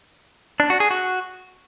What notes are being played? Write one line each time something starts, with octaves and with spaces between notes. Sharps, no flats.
D4
F#4
G#4
F#4